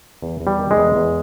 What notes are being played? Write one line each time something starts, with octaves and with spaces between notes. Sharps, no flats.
E2
E2
G3
D#3
G#3
E2
E2